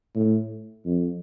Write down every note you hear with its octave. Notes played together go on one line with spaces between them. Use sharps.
A2
F2